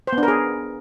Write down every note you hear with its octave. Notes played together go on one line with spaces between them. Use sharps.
C5
B3
D4
A#4
G#4